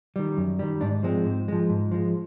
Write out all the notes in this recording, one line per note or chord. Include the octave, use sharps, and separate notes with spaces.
D#3 G3
F#2
D#3 G3
G#2 D4
F3 G#3 C4
G#2
F3 G#3
G#2
F3 G#3